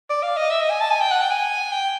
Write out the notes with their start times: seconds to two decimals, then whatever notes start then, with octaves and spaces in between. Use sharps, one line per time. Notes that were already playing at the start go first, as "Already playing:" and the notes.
0.10 D5
0.23 F5
0.37 D#5
0.50 E5
0.60 D#5
0.70 G#5
0.81 A5
0.91 G#5
1.01 G5
1.11 F#5
1.21 G5
1.31 G#5
1.72 G5